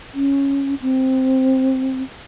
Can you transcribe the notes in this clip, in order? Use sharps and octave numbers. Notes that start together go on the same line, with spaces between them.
C#4
C4